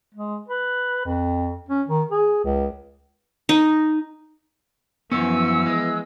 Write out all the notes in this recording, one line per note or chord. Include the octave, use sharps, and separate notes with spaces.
G#3
B4
F2
C#4
D#3
G#4
C#2
D#4
F#2 E3 F3 B3 C#4 E6
G#3